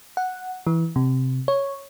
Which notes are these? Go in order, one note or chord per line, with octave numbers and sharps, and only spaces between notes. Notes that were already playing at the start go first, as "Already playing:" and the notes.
F#5
E3
C3
C#5